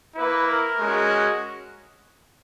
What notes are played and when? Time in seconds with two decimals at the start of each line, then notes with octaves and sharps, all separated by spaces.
0.16 A#3 E4 B4
0.47 A#4
0.78 G#3 C#4 F#4